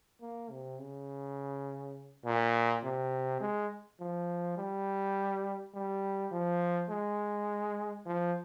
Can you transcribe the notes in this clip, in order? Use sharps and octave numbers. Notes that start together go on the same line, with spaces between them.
A#3
C3
C#3
A#2
C3
G#3
F3
G3
G3
F3
G#3
F3